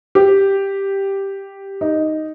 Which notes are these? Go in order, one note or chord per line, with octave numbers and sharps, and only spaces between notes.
G4
D#4